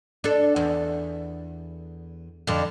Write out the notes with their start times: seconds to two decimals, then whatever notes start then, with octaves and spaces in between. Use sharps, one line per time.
0.24 D4 A4
0.56 E2
2.47 F2 D3